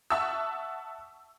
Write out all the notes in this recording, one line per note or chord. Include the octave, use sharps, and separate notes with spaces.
E5 F#5 A5 C#6 D#6 E6